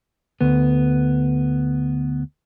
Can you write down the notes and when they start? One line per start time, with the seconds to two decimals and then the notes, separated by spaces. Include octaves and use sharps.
0.41 D2 B3